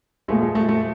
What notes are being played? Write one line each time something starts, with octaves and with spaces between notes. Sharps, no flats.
A#2 F3 G#3 A3
G#3
A3
A3